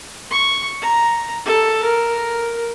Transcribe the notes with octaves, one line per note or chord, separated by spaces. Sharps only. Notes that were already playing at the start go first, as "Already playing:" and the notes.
C#6
A#5
A4
A#4